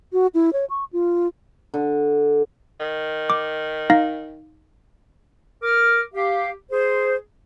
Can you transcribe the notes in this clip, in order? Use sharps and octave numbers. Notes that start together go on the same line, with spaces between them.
F#4
E4
C#5
C#6
F4
D3
D#3
D6
D#4 F5 A#6
A#4 D6 F6
G4 F5
G#4 C5